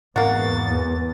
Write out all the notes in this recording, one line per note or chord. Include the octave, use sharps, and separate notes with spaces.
E2 G#2 A#3 C4 F#4 A6